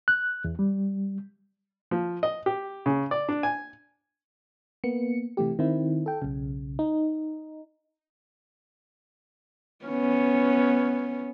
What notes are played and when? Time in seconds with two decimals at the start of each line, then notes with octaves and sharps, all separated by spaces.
0.08 F#6
0.45 E2
0.59 G3
1.91 F3
2.23 D#5
2.46 G4
2.86 C#3
3.11 D5
3.29 D4
3.43 G#5
4.84 A#3 B3 C#7
5.37 C3 E3 A3 G4
5.59 D#3 C4 E4
6.06 A4 G5
6.22 B1 C#3
6.79 D#4
9.85 B3 C#4